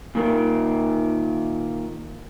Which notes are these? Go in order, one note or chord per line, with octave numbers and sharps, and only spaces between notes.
A#2 D#3 A#3